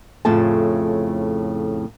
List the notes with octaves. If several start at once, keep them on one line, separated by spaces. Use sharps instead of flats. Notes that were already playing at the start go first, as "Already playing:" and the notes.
F2 A2 C#3 A3 A5